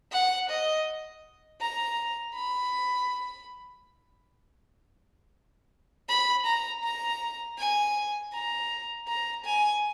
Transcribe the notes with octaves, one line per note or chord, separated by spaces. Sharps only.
F#5
D#5
A#5
B5
B5
A#5
A#5
G#5
A#5
A#5
G#5